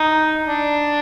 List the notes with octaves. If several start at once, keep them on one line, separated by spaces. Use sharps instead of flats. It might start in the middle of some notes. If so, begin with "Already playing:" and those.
Already playing: D#4
D4